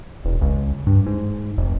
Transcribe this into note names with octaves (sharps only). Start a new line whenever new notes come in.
E1
C#2
G2
G#2
F1